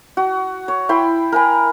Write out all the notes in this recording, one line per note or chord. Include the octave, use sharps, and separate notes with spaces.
F#4
C#5
E4 G5 B5 C6
A#4 G#5 B5